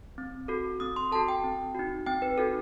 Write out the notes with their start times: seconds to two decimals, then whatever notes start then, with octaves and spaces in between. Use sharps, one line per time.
0.18 C4
0.48 F#4 A4
0.80 C4 D#6
0.96 C6
1.12 F#4 A4 A5
1.28 G5
1.44 C4
1.75 D#4 F#4
2.07 C4 G5
2.22 B4
2.38 D#4 F#4 A4